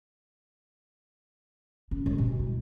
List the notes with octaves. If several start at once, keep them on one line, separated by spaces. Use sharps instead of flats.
C#4
G#3
B2
E4